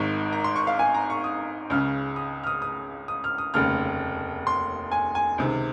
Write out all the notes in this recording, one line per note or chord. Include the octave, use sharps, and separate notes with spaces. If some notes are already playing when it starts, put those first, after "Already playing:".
Already playing: G#1 G#2 D#3 C#6
A#5
C6
C#6
F5
G#5
A#5
C#6
D#6
C#2 C#3 F6
D#6
F6
D#6
D#6
D#6
F6
D#6
F1 D#2 C#3 F6
C6
G#5
G#5
C#2 C3 D#3